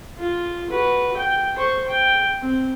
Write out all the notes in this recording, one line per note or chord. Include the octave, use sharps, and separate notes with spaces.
F4
F#4 B4
G5
C5 C#6
G5
C4